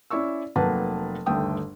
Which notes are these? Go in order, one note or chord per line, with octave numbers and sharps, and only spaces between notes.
C#4 E4 D5 C#6 E6
F1 F#3 A#3 B4 A5
G1 D#2 A3 G5 D#6